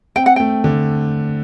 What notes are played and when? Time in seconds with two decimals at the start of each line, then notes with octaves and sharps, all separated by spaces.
0.16 C4 G5
0.26 F#5
0.36 A3 G5
0.64 D3